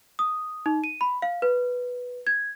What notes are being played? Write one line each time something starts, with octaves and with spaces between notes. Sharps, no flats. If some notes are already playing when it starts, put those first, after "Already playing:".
D#6
D#4
D#7
B5
F5
B4
G#6